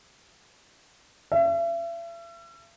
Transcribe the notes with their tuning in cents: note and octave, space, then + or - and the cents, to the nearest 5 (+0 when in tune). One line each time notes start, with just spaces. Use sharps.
E5 +40